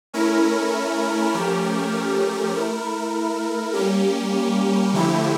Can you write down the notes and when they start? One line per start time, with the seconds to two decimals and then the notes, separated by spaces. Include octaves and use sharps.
0.13 A3 C#4 E4 A#4
1.34 F3 A3 C#4 G4 A#4
2.54 A3 E4 A#4
3.73 G3 A#3 C#4 G4
4.93 D3 F3 A3 E4 G4